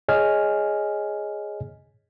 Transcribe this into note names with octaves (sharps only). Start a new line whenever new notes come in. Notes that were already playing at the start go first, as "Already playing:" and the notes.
G#4 C#5 D#5 G#5 F6